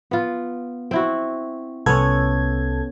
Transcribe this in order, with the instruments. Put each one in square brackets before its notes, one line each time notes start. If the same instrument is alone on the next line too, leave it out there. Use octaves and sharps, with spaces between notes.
[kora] B3 F4
C4 E4 F#4
[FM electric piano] C2 A4 G#6 [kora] B3 C#4